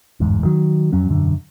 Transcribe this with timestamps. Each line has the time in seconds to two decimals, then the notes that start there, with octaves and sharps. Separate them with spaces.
0.20 G1 E2 G#2
0.45 D#3 F#3
0.92 F2 F#3 C#4
1.09 E1 F#2 D3